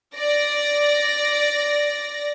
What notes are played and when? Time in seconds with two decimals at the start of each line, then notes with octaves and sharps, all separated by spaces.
0.15 D5 A#6